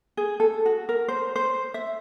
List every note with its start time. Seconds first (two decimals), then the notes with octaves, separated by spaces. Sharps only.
0.17 G#4
0.40 A4
0.66 F#4
0.89 A#4
1.08 C5
1.36 C5
1.74 E5